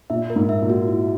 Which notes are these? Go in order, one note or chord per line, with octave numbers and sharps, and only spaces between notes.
A#2 E5
A#4
G#2
E5
A#2
F#4
E4